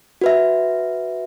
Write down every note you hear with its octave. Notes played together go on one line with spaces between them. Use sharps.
F#4 B4 E5